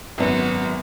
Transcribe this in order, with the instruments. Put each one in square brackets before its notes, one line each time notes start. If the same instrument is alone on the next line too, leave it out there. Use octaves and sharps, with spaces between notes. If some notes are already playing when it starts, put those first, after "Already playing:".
[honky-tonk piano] G#1 F#2 [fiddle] B3 F#4